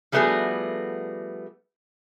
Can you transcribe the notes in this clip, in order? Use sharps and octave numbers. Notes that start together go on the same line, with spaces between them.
F3 G3 A3 B3 F#4 G#4